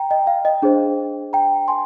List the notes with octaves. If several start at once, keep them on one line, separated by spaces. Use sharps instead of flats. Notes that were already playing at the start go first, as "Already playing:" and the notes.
Already playing: G5 A#5
D#5 G5
F5
D#5 G5
D4 G#4 C5
G5 A#5
G#5 C6